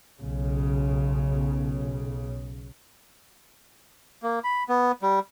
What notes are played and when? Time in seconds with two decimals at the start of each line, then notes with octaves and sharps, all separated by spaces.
0.20 B1 C#3
4.23 A#3
4.44 B5
4.69 B3
5.02 G3